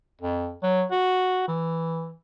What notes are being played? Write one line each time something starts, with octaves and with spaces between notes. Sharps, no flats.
F2
F#3
F#4
E3